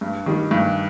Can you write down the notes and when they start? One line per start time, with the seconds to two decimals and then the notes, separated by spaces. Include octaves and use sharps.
0.01 G2
0.26 D#3 G3
0.51 G2